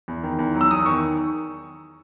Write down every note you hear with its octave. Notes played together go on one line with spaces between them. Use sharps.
E2
D#3
E2
F#3
E6
E2 D#6
D#3 C#6